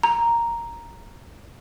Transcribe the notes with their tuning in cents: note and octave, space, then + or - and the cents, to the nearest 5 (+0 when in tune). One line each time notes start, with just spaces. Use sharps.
A#5 +0